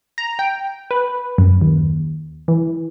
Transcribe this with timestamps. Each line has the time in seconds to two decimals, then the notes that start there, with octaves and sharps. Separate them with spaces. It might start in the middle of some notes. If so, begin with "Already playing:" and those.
0.18 A#5
0.39 G5
0.91 B4
1.38 F#2
1.61 D#2
2.48 E3